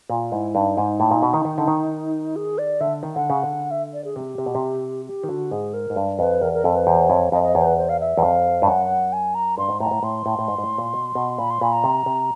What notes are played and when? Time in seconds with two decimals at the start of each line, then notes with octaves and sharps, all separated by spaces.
0.10 A#2 F4
0.32 G#2 E4
0.55 G2 D#4
0.77 G#2
1.00 A2
1.11 A#2
1.22 B2
1.34 D#3
1.45 D#3
1.58 D3
1.68 D#3
2.36 G#4
2.58 D5
2.81 D3 E5
3.03 D#3
3.15 D3 F#5
3.30 C#3
3.43 D3
3.71 E5
3.93 D5
4.04 G#4
4.15 C3 G4
4.38 C3
4.46 B2
4.55 C3
5.06 G4
5.24 D#3
5.28 D3 F#4
5.51 G#2 G#4
5.73 A#4
5.90 G#2
5.96 G2
6.19 F2 B4
6.41 E2 A#4
6.53 A#4
6.64 F2 A4
6.75 B4
6.87 E2 C5
7.09 F2 C#5
7.32 F2 D#5
7.43 D#5
7.55 E2 C#5
7.61 C5
7.66 B4
7.77 C5
7.89 F5
8.00 E5
8.17 E2
8.22 F2 F5
8.62 G2
8.67 F#2 F#5
9.13 G#5
9.35 A#5
9.58 G2 C6
9.69 G#2
9.80 A2 A#5
9.86 G#2
9.91 A2
10.03 A2 C6
10.26 A2
10.39 A2
10.48 G#2
10.58 G#2
10.64 A2
10.78 A#2
10.94 B2
11.15 B2
11.38 A#2 B5
11.50 C6
11.61 A#2 B5
11.72 A#5
11.84 C3
12.06 C3